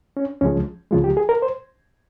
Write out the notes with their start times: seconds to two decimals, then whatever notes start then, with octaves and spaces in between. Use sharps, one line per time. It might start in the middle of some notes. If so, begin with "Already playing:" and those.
0.17 C#4
0.41 C#2 C#3 F3 G#3 C#4
0.91 C#2 C#3 F3 G#3 F4
1.04 G4
1.17 G#4
1.29 A#4
1.42 C5